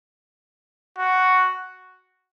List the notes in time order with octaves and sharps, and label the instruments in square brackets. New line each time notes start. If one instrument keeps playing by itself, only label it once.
[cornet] F#4